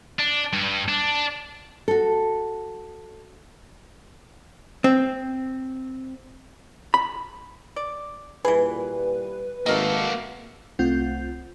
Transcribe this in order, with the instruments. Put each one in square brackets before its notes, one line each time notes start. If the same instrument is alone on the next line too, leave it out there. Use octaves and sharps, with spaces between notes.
[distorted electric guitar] D4
G2
D4
[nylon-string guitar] F#4 A4
[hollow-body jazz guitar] C4
B5
[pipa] D5
[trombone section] A#2 G3 [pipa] E3 G#4 [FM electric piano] B4
[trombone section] G#1 [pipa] A3 A#4 D#5 [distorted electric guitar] A#3 F#4
[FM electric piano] C2 A3 C4 F4 F#5 G6